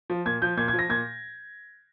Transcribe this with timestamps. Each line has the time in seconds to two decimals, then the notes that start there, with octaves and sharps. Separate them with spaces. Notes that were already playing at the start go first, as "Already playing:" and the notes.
0.10 F3
0.25 A#2 G#6
0.42 F3 G6
0.57 A#2 G#6
0.68 G#6
0.73 F3
0.79 A#6
0.89 A#2 G#6